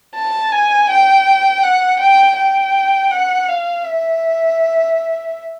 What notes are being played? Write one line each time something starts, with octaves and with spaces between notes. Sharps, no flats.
A5
G#5
G5
F#5
G5
G5
F#5
F5
E5